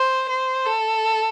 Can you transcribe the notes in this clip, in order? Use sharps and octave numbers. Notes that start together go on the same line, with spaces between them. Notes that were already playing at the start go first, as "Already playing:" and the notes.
Already playing: C5
C5
A4